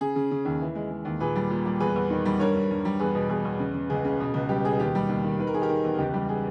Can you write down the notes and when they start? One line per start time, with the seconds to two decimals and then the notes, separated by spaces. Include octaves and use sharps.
0.01 C#3 G#4
0.16 C#3
0.31 C#3
0.45 D#2
0.61 E3
0.75 G#3
0.90 G#3
1.05 D#2
1.20 A#2 G#4 B4
1.36 G3
1.50 A#2
1.66 G3
1.80 E2 G#4 B4
1.96 E2
2.10 D#3
2.25 G3
2.40 G2 A#4 C#5
2.56 G2
2.71 G2
2.85 G3
2.99 E2 G#4 B4
3.15 B2
3.29 E2 G#4
3.45 E2
3.60 C#3
3.74 C#3
3.90 C#2 G#4
4.05 C#3
4.20 B2
4.34 C#2
4.49 G3 G4
4.64 B2 G#4
4.80 D#2 G4
4.95 G3
5.09 D#2
5.24 D#3
5.39 D#3 B4
5.47 A#4
5.54 D#3 G#4
5.62 G4 A#4
5.70 D#3
5.84 E2
5.99 C#2 G4
6.14 G3
6.29 G#4